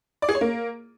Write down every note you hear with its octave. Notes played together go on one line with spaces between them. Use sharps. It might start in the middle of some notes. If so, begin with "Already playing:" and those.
D5
G#4
C#5
A#3